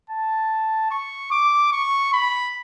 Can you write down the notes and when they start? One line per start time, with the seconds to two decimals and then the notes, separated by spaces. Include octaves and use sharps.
0.10 A5
0.91 C#6
1.31 D6
1.72 C#6
2.13 B5